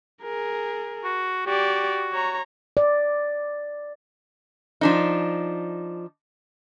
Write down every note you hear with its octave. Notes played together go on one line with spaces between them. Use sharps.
G#4 A#4
F#4
F#4 G4 D5
C#5 A#5
D5
F3 D4 D#4